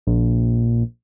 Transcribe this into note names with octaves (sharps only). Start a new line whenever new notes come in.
A#1